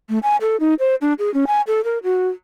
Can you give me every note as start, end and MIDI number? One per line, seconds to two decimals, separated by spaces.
0.09 0.18 57
0.23 0.36 80
0.41 0.56 69
0.60 0.74 63
0.79 0.95 72
1.01 1.13 62
1.19 1.32 68
1.34 1.45 61
1.47 1.61 80
1.67 1.81 69
1.84 1.98 70
2.03 2.28 66